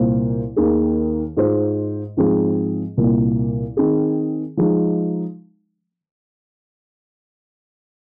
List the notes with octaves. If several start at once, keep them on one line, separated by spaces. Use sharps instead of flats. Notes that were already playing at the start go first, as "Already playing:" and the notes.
Already playing: C2 A#2 A#3 F4 C5
D#2 D#3 A#3 G#4
G#2 G#3 F4 C5
G#2 F3 C4 F4 G#4
C2 A#2 A#3
D#3 C4 G#4
F3 G#3 D#4